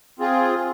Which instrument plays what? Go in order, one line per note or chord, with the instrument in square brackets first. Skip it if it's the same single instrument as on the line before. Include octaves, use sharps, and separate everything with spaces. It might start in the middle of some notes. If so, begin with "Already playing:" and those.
[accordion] C4 F4 G#4